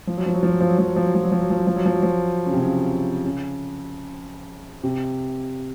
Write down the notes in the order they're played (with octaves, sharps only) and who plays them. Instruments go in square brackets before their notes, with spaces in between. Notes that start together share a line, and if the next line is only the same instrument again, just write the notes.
[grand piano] F3
F#3
F3
F#3
F3
F#3
F3
F#3
F3
F#3
F3
F#3
F3
F#3
F3
F#3
F3
F#3
F3
F#3
F3
F#3
F3
C#3
C3
C#3
C#3
C3